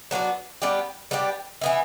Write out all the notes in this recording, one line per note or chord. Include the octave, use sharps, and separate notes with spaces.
F#3 B3 D4 F#4
G3 B3 D4 G4
G3 B3 D4 G4
E3 B3 E4